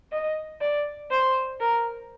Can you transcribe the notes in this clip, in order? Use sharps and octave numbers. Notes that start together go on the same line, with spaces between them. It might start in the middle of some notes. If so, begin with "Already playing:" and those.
D#5
D5
C5
A#4